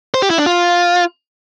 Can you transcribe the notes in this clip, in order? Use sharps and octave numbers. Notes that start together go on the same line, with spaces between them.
C5
G4
E4
D4
F4